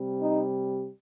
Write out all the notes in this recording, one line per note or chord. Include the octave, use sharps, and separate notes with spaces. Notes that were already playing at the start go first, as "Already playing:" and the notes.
Already playing: C3 G3
D#4